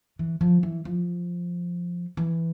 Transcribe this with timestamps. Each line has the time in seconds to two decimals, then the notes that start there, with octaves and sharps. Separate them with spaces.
0.19 E3
0.41 F3
0.63 E3
0.85 F3
2.17 E3